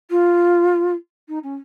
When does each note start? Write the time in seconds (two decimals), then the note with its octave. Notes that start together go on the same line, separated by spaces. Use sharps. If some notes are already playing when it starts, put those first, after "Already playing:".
0.10 F4
1.28 D#4
1.43 C#4